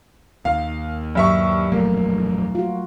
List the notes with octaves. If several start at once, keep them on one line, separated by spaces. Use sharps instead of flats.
D#2 F5
G2 F#3 E5 C#6
E1 A#1 F#2 F#3 A3 A#3
F4 F#4